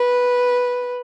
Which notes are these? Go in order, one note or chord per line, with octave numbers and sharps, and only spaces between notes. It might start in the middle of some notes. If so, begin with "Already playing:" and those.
Already playing: B4